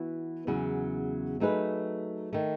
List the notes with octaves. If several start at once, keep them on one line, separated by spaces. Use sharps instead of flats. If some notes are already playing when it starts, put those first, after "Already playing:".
Already playing: E3 B3 F#4
E2 C#3 F#3
F#3 A3 D#4 G#4 B4
D#3 A3